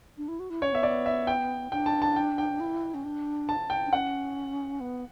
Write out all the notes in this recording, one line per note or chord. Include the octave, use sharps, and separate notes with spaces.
D4
E4
F#4
E4
C#4 C#5
B3 E5
D5
E5
G5
D4 G5
A5
A5
G5
G5
E4
C#4
D4
A5
G5
D4
C#4 F#5
B3